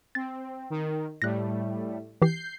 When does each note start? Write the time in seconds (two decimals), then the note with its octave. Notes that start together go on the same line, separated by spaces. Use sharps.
0.15 C4 A6
0.70 D#3
1.22 A2 G3 A3 F#6 A#6
2.22 E3 G4 G6 C7